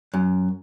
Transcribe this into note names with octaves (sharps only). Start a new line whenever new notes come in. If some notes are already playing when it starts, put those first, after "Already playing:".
F#2